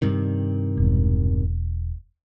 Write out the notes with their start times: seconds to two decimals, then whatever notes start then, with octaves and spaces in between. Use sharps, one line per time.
0.02 G2 C3 D#3
0.77 E1